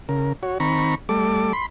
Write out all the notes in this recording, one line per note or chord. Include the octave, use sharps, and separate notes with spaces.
C#3 A#4
F#4 C#5
D#3 C4 A#5 B5 C#6
G3 A3 A4 D6
B5 C6